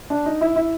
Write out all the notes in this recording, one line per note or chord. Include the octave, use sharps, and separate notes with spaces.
D4
D#4
E4
E4